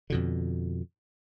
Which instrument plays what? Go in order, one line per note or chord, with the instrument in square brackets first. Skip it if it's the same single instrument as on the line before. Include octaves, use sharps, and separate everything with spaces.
[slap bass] F2 B2 D3